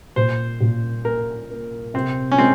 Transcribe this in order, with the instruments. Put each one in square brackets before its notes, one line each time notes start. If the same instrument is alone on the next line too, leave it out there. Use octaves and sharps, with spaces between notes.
[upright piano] A#2 [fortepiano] C5
[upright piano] A#2
[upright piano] A#3 [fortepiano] A#4
[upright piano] A#3
[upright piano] C3 [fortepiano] C4
[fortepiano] C#4
[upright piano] G#3 [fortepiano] C4